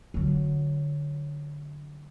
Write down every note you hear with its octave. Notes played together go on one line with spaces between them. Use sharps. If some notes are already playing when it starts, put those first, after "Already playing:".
D3 F#3